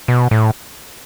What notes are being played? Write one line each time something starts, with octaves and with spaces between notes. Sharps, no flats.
B2
A2